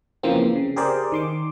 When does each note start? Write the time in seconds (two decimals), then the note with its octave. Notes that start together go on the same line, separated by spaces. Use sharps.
0.23 C#3 E3 F3 A#3 C4
0.56 C#3
0.76 G4 G#4 A#4 C5 D5
1.12 D#3 C6 D6